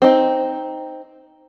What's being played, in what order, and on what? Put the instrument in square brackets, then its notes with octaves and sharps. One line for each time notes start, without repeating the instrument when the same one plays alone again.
[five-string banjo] C4 D#4